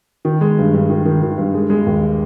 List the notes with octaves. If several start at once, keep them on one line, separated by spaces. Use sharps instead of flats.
D#3
G#3
G2
G2
D#3
D#3
D#3
G2
G#3
G#3
D#2